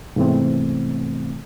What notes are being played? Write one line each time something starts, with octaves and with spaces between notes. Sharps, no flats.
G#2 C3 E3 A3 B3 C4